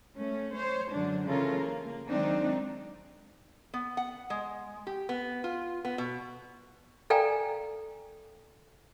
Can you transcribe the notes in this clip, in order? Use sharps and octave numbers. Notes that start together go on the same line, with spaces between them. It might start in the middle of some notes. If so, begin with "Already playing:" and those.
A3 C#4
C5 C#5
F#2 D3 G#3 D4
C#3 E3 C#4 F4 A4 A#4
A#3
D#3 F#3 G#3 C4 D4 D#4
B3
F#5
G#3
G4
B3
F4
B3
B2
A4 D5 F5 G5 G#5 A#5